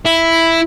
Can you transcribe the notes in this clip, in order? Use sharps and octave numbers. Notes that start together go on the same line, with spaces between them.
E4